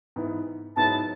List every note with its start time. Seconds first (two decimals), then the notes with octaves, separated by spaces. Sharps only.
0.16 G#2 E3 B3 E4
0.76 G#2 F#3 B3 E4 G#4 A5